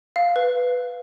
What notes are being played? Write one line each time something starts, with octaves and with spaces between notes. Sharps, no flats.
F5
B4